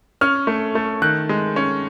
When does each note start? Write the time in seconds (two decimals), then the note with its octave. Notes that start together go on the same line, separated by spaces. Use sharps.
0.21 C#4 F6
0.47 A3
0.75 A3
1.02 D#3 F#6
1.29 G#3
1.56 C#4